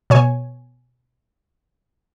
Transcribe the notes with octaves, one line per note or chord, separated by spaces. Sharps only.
B2 C#5 G#5